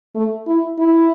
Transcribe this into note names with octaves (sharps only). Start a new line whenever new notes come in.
A3
E4
E4